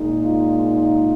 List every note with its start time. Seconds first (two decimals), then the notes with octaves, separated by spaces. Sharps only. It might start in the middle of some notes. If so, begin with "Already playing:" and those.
Already playing: A#2 G#3 D#4
0.25 F4